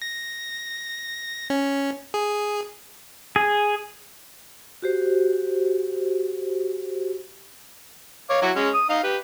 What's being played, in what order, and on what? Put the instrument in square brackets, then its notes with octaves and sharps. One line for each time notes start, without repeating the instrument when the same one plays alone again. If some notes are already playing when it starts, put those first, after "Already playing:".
[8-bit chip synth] A#6
C#4
G#4
[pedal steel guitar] G#4
[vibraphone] F#4 G4 C5
[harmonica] C#5 F5 D6
F#3 E4 F#4
G#3 C#4
D#6
D#4 F5
G4 B4